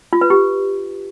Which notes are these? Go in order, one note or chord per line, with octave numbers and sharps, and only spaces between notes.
F4
B4
G4